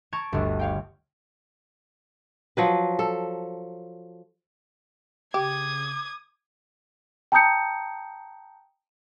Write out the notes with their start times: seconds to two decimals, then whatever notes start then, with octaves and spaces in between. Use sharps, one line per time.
0.13 A5 A#5 C#6 G#6 D7
0.32 G1 D2
0.59 C#5 F5 G5
2.57 F3 F#3 B4
2.99 A4
5.34 C#3 G4 D6 D#6 G#6
7.32 G5 A5 A#5 D#6 G6 C#7